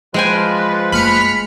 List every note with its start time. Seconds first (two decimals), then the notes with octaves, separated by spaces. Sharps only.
0.14 F3 G#3 B4 G5 G#5
0.92 F#1 A3 B5 F6 C#7